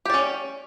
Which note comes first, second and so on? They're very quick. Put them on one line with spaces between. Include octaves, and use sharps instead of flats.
G4 D5 C#4